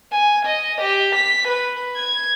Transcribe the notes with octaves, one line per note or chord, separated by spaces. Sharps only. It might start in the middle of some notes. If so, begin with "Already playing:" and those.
G#5
D#5
G4
B6
B4
G#6